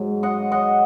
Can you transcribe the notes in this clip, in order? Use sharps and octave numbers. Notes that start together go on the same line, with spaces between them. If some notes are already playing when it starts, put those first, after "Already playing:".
Already playing: G#2 F#3
D#5 F#5
D#5 F#5